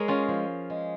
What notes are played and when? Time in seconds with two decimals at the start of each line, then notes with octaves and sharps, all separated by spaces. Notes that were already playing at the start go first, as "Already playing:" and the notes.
Already playing: G#3 G#4 A#4 C#5
0.08 C#4 F4
0.29 F3
0.70 G#3